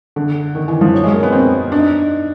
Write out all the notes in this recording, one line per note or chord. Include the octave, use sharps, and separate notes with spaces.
D3
D#3
E3
F3
F#3
G#3
A#3
B3
C4
D4
D#4